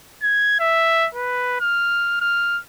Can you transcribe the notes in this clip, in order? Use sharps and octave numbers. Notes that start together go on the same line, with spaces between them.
G#6
E5
B4
F6
F6